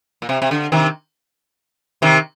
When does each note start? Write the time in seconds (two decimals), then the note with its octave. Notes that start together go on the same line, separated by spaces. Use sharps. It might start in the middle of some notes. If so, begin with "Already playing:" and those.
0.22 A#2
0.29 C3
0.42 C3
0.51 D3
0.72 C3 D#3
2.02 C3 D#3